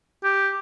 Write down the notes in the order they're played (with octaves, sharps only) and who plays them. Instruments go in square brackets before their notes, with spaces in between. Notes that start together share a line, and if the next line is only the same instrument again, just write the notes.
[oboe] G4